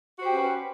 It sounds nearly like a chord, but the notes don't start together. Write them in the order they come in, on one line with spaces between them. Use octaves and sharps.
F#4 C5 G4 C#4 B4